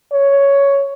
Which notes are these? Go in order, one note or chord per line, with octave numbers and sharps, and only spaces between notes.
C#5